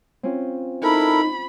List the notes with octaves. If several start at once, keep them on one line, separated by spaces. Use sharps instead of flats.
C4 C#4 F4
D#4 E4 A4 A#4 B5